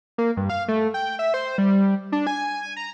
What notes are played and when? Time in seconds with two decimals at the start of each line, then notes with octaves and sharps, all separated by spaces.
0.18 A#3
0.37 G2
0.50 F5
0.68 A3
0.94 G5
1.19 E5
1.34 C5
1.58 G3
2.12 D4
2.27 G#5
2.77 A#5